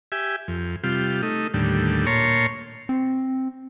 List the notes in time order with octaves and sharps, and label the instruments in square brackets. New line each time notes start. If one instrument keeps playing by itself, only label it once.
[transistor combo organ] G4 E5 G#5
F2
C3 G3 F4
A3 D#4
D#2 A2 D3 G3
A#2 C#5 A5 A#5 C6 C#6
[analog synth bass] C4